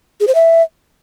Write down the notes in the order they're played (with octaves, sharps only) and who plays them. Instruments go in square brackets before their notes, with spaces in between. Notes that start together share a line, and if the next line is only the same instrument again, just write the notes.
[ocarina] G#4
C5
E5